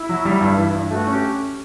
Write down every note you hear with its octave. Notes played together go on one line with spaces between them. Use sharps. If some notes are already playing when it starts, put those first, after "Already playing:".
Already playing: E4
F#3
G3
G2
E3
G2
A3 F#4
C#4
G4